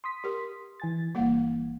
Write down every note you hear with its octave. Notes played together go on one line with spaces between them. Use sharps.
C6 D#6 B6
G4 A#4
E3 G#5 A6
G1 E3 G3 A#3 F#5